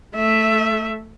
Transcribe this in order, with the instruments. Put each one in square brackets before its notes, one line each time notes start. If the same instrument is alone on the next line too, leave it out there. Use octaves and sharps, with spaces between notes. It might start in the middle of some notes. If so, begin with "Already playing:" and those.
[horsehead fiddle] A3 E5